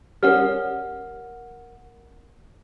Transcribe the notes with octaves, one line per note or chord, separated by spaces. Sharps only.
G3 C#4 A#4 F#5 F6